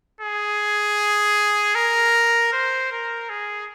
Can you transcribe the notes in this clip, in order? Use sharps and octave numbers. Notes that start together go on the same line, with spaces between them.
G#4
A#4
C5
A#4
G#4